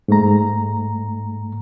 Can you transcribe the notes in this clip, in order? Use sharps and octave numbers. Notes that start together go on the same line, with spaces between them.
G#2 A3 A#5